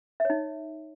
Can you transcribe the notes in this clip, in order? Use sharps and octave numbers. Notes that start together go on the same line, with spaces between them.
D#4 C#5 E5